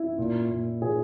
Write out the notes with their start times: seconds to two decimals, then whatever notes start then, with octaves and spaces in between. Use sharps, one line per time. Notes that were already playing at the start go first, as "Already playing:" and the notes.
Already playing: E4
0.18 A#2
0.51 A#2
0.82 A#2 G#4